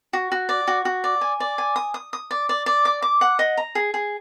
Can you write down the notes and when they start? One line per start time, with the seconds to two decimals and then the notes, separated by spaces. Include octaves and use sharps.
0.13 F#4
0.32 F#4
0.49 D5
0.67 F#4
0.85 F#4
1.04 D5
1.21 G#5
1.40 D5
1.58 G#5
1.76 D#6
1.94 D#6
2.13 D#6
2.31 D5
2.49 D5
2.66 D5
2.85 D6
3.02 D6
3.21 F#5
3.39 D#5
3.57 A#5
3.75 G#4
3.94 G#4